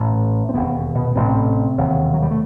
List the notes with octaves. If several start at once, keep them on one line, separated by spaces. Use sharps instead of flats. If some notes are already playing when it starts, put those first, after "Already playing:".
Already playing: A1 A2 A3
C4
E1 D#2 B2 B3
B2 B3
A1 A2 C3 C4
E1 D#2
F#3
G3
A3